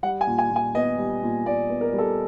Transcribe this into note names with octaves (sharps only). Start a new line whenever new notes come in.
G3 F#5
G#5
A#2
G#5
A#2
G#5
B3 D#5
G3
A#2
A#2 D5
B3
A#4
G3
A4